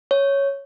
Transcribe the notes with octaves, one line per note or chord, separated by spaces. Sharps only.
C#5